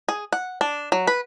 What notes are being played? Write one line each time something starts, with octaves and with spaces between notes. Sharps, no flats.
G#4
F#5
D4
F#3
B4